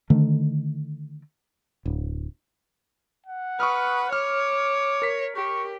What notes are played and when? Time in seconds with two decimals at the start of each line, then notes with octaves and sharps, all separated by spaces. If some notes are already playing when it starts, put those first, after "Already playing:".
0.10 D3 D#3 A3
1.86 D1
3.26 F#5
3.60 B4 C#6 D#6 F6
4.13 C#5 D6 F6
5.02 A#4 B6
5.36 G4 C#6